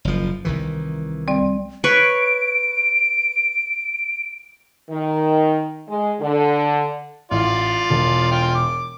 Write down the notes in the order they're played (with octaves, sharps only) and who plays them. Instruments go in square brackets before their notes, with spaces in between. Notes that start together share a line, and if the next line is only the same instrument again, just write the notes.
[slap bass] F#1 F3
C2 D#3 E3
[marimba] G3 C4 D5
[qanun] B4 C#5 C#6 [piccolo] D7
[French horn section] D#3
G#3
D3
[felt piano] A1 [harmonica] F4 D5 F5
[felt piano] E1
[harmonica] F4 G5 F6
D6